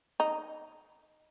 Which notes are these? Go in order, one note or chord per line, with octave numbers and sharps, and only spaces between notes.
D#4